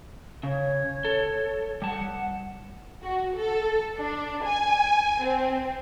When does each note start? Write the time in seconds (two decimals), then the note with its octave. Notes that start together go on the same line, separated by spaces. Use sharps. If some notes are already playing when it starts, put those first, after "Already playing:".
0.43 C#3 C#5
1.05 A4
1.82 G3 F#5 A5
3.03 F#4
3.36 A4
3.97 D4
4.44 G#5
5.24 C4